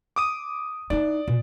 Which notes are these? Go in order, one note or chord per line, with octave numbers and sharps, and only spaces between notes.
D6 D#6 D#7
D#4 E4 D5
A#2